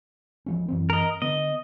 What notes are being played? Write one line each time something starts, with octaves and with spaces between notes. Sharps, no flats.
F3 G3 C#4
F#2 E3 C4
A#4 D#5
D3 B3 D#5